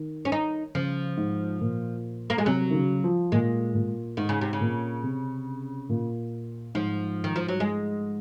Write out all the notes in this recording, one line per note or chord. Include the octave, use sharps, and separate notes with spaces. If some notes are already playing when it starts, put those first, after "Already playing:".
Already playing: D#3
C#4
D#4
C#3 F3
G#2
A#2
A#3
G#3
C3 F#3
D#3
C#3
F3
A#2 G#3
A#2
G#2 D#3
C#3
C3
C#3
A#2
C3
A#2
G#2 F3
D#3
F3
F#3
G#3